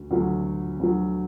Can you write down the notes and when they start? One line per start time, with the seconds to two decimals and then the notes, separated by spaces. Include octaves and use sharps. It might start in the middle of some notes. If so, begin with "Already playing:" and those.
Already playing: D2 D3
0.11 D2 D3 F#3
0.79 D2 D3 F#3